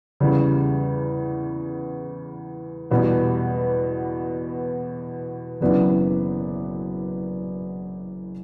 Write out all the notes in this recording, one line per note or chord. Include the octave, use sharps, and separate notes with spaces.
E2 C#3 G3
E2 B2 G3 B3
F#1 F#2 E3 B3 D4